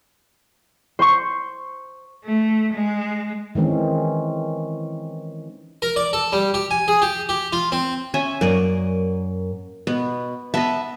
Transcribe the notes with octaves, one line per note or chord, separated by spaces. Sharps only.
C5 C6 C#6
A3
G#3
D#3 E3 G#3 C4 C#4
A#4
D5
A4
G3
G4
G#5
G#4
G4
G4
F4
C4
C#4 E5 G#5
F#2 A#3 D5 D#5
B2 B3
B3 D#5 E5 A5